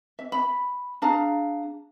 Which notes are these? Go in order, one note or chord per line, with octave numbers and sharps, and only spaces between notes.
E5
B5
D4 G#4 F5 A#5